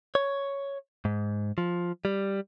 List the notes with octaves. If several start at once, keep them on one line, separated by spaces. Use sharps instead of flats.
C#5
G#2
F3
G3